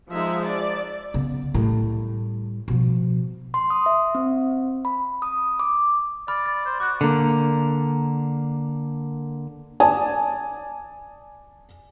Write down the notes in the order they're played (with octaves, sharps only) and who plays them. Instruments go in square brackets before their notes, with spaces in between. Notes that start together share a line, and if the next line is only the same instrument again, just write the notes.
[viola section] F3 G#3 D#4 G#4 E5
D5
[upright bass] C#3 B3
A2 G3
B2 F3
[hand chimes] C6
D#6
E5
C4
B5
D#6
D6
[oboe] D5 [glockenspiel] B5 F6
[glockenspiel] A6
[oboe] C5
[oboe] F#4 [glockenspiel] D6 F#6
[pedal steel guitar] D3 A#3
[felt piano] D5 G#5 A5 D#6